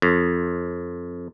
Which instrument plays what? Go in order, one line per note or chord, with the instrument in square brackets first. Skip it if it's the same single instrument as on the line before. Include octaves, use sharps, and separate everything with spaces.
[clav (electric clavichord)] F2